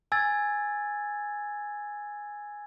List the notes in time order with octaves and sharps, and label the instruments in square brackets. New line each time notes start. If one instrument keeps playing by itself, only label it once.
[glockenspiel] G#5 E6 G#6 A6